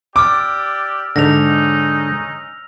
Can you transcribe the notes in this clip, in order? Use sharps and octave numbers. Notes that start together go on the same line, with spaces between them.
G4 D5 D6 E6 F6
G#2 D3 C#4 D#4 A#6 F7